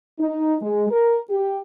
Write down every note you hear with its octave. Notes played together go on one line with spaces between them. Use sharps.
D#4
G#3
A#4
G4